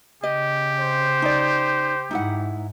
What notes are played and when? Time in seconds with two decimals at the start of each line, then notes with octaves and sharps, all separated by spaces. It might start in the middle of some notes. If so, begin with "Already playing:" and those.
0.23 C#3 G4 D#5
0.80 C5
1.22 D#4 D5
2.11 G#2 D#4 E4 F#5